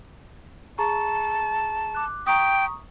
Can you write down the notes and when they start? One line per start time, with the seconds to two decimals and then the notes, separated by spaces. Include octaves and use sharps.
0.78 G#4 A5 A#5 C#6
1.95 D6 F#6
2.27 G5 A#5 C#6 D#6